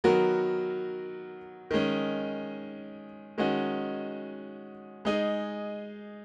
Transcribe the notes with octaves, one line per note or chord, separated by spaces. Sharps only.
D#3 F#3 B3 F#4 A#4
D#3 G#3 C#4
D#3 G#3 C#4 F#4
G#3 D#4 G#4